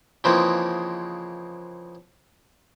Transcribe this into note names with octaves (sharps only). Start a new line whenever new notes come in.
C#3 E3 F3 G#3 A#3 C4